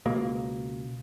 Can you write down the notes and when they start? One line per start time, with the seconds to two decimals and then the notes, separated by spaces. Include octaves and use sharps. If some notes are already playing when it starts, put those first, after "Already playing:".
0.06 C#2 B2 A#3